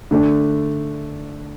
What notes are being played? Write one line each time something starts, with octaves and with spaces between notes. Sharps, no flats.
D3 A3 D4